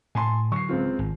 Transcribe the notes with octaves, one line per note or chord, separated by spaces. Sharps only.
A2 G#5 A5 C6
D3 F#3 C#6 C7
C#2 C4 F4
G#1